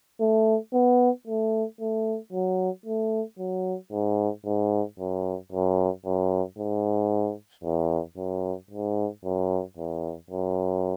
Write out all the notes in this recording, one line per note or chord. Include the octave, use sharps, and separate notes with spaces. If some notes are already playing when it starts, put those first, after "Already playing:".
A3
B3
A3
A3
F#3
A3
F#3
G#2
G#2
F#2
F#2
F#2
G#2
E2
F#2
G#2
F#2
E2
F#2